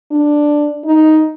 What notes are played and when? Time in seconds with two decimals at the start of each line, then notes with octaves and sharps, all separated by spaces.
0.11 D4
0.85 D#4